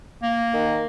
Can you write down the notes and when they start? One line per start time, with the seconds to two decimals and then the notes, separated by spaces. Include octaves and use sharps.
0.23 A#3
0.53 D#3